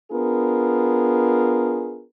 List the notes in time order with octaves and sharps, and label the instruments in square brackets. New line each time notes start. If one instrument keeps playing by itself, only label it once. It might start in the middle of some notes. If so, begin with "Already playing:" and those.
[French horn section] B3 D4 F4 G#4 A#4